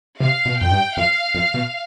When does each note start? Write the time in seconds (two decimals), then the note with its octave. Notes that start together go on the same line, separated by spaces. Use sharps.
0.20 C3 F5
0.45 B2
0.59 F2 G5
0.71 G2
0.96 F2 F5
1.35 F2
1.54 B2